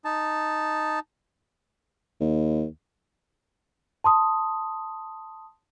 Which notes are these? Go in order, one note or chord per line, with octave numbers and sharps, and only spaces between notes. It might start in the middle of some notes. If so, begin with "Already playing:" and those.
D#4 A5
D#2
A5 C6 D#6